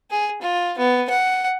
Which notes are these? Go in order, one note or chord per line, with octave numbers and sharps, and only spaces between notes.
G#4
F4
B3
F#5